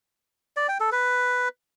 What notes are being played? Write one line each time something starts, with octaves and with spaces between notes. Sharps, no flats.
D5
G5
A4
B4